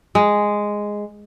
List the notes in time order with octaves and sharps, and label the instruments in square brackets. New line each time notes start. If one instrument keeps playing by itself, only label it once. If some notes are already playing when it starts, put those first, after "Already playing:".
[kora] G#3